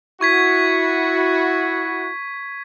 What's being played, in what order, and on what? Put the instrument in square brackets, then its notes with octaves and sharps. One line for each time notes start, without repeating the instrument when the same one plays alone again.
[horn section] E4 F#4 [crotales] C#6 G#6 B6